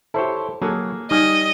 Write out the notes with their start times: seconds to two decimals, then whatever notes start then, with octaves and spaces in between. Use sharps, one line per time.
0.14 E4 G4 A4 C5 C#5
0.62 F#3 A#3 G#4 A4
1.11 G3 D#4 D#5 G#5 D#6 F6